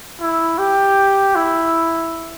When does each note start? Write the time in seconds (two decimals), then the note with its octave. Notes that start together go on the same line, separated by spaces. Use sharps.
0.20 E4
0.59 G4
1.36 E4